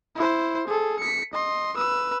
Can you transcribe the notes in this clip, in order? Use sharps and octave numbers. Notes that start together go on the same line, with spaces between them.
E4 C5
G#4 A4
B6 C#7
D#5 C6
B4 E6